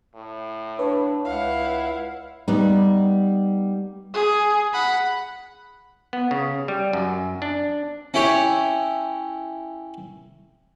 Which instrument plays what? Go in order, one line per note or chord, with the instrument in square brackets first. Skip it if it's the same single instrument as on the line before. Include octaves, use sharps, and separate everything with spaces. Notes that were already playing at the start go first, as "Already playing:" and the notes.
[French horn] A2
[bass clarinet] D4 [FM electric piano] B4 C#5
[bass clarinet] C#2 [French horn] E4 [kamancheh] F5 F#5
[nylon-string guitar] G3 B3 D#4
[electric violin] G#4
F#5 B5
[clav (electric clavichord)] B3
C#3
G3
F#2
D4
[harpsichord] C#4 E4 G4 C#5